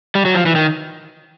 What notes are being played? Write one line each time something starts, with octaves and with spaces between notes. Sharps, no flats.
G3
F#3
F3
E3
D#3